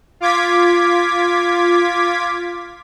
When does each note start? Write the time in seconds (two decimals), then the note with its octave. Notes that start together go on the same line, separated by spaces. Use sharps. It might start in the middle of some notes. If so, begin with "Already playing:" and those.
0.20 F4 D6 G#6 B6